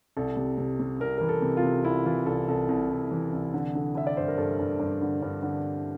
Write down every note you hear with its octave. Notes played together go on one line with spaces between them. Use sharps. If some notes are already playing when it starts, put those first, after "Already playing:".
C2 A4
C3
C3
C3
C2 A#4
E3 A#4
A4
C3
F4
C3
C2 E4
E3 F4
C2 A4
C2 A4
C2
C2
E3
C2
D3
D3
D3 E5
D5
G2 C5
A#4
G2 A4
G2
G2
D3
G2
D3